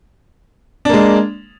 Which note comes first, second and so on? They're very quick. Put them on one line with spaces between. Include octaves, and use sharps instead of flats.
D4 A#3 G#3